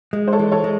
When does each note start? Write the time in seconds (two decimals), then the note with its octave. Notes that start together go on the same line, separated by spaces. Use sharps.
0.13 G#3
0.28 C5
0.33 A4 C#5
0.39 E3
0.51 A4 C#5
0.64 G#3